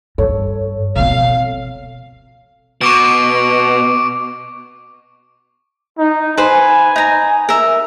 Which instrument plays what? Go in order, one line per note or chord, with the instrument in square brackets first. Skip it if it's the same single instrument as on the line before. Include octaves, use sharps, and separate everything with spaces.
[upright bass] G2 [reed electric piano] A4 C#5
[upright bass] B2 C4 [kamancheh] F5
[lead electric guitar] B2 [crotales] C#6 D6 D7
[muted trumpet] D#4
[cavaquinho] B4 C5 [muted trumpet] G#5
[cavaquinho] D#4 A#5
A#4 E5